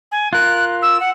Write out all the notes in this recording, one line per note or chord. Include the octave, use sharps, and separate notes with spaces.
G#5
F4 A#4 F#6
E6
F#5